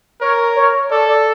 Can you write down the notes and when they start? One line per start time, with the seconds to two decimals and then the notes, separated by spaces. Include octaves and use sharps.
0.21 A#4 C#5
0.56 C#5
0.90 A4 D5
1.09 D5